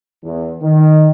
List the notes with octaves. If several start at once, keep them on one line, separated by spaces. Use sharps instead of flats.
E2
D#3